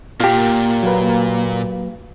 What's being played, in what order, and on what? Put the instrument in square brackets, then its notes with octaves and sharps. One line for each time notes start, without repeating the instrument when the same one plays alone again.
[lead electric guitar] A#2 [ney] A#3 [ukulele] F4 G4
[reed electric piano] F#3 B4